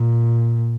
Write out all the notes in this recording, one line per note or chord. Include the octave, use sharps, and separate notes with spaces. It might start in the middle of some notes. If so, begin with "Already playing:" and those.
Already playing: A#2